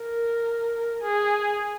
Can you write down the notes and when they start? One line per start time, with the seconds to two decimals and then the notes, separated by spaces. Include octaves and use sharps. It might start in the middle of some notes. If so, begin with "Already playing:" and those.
Already playing: A#4
1.02 G#4